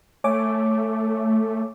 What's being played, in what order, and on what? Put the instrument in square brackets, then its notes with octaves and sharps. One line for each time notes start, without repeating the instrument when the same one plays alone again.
[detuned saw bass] A3 [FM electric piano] C#5 G#5 D6